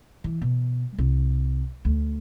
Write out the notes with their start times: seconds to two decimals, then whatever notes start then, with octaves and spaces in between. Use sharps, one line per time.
0.24 E3
0.42 B2
0.98 C2
1.85 D2